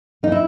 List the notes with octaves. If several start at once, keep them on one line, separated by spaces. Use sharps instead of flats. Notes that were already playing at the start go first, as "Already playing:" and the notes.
A#3 D#4
E4